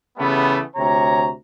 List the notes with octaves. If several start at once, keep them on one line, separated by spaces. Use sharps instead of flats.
C#3 E3 G3 A3 B3
D2 C3 C#5 A#5